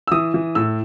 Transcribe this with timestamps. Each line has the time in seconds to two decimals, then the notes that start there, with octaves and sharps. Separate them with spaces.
0.07 E6
0.12 E3 D#6
0.34 E3
0.55 A2 E6